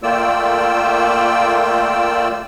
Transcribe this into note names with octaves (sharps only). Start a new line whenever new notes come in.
A3 A#3 F4 D5 G5 E6